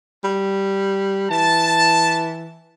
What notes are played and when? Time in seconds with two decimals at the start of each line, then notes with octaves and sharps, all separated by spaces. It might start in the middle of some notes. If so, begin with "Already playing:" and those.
0.24 G3
1.31 E3 A5